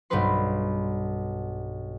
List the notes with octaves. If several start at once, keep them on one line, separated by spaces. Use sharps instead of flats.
B1 G2 G3 B3 B4 C6